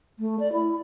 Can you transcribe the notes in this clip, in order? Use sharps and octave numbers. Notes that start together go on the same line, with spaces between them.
A3
D5
E4